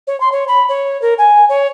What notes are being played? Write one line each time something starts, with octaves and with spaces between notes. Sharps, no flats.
C#5
C6
C#5
B5
C#5
A#4
G#5
C#5